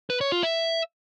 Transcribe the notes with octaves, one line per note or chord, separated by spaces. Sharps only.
B4
C#5
F4
E5